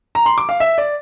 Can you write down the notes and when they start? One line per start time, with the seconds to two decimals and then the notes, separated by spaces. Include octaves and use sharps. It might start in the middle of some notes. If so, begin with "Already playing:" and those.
0.15 A#5
0.26 C6
0.38 D6
0.49 F5
0.60 E5
0.78 D5